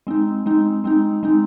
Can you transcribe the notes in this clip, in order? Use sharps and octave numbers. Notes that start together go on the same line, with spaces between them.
G#3 C4 D#4
G#3 C4 D#4
G#3 C4 D#4
G#3 C4 D#4